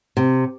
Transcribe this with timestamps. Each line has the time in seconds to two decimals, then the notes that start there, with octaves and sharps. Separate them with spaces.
0.17 C3